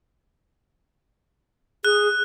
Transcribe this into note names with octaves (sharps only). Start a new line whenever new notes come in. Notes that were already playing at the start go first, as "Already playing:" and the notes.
G#4 F#6